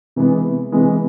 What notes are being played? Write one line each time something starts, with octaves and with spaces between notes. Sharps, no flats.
C3 E3 G#3 B3
C3 E3 G#3 B3